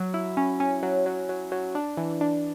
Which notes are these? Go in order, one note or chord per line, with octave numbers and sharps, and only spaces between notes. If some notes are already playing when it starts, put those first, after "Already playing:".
Already playing: F#3
E4
C#4
C#4
F#3
F#3
F#3
F#3
D4
E3
D4